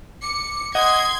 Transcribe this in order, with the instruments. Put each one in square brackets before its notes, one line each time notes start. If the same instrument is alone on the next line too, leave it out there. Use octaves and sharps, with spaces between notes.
[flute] D6 [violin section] C#7
[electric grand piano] D#5 F#5 [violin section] C6 G#6 [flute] D#6